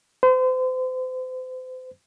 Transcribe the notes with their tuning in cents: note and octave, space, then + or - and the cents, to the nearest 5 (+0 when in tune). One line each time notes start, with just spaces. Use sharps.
C5 -35